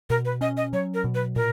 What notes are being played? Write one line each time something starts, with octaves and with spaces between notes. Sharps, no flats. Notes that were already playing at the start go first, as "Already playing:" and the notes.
B2 A#4
B4
C#4 D#5
D#5
F#3 C#5
A#4
B2
B4
A#2 A#4